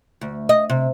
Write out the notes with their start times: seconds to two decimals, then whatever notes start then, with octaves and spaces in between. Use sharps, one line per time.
0.21 D2
0.49 D#5
0.70 C3